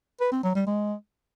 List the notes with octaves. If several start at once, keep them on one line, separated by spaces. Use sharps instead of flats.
B4
C4
F#3
G3
G#3